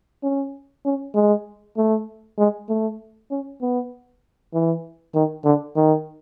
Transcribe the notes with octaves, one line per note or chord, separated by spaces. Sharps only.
C#4
C#4
G#3
A3
G#3
A3
C#4
B3
E3
D#3
D3
D#3